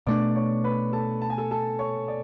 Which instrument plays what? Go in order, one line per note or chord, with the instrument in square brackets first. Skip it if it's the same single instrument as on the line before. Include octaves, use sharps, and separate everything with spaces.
[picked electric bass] B2 A3 D4 [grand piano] D5 D6
[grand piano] C#5 C#6
B4 B5
A4 A5
A5
G#5
A4 A5
A4 A5
C#5 C#6
D5